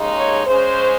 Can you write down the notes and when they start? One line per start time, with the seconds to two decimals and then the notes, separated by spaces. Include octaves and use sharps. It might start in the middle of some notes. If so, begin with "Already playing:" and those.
Already playing: D#2 C#3 G#3 D#4
0.16 C#5
0.46 C#3 G#3 C#4 C5